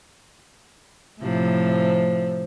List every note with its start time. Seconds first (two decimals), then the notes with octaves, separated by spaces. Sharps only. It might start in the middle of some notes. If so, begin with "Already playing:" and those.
1.21 A2 C3 F3